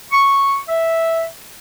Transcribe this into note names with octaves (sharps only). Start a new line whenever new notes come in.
C#6
E5